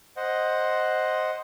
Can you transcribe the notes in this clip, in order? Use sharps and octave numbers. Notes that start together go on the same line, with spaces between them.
C5 D#5 F#5